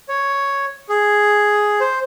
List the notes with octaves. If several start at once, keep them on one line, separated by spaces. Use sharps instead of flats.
C#5
G#4
C5